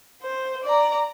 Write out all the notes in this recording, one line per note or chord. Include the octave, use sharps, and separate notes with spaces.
C5
D5 A#5